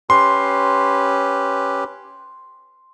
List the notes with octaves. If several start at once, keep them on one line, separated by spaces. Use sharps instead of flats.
C#4 G4 B4 C6